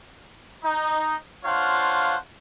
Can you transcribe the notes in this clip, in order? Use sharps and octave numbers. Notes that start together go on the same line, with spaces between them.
D#4
D4 F4 C5 C#5 F5 F#5